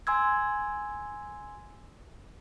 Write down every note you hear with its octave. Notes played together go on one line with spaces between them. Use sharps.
G#5 C6 E6 G#6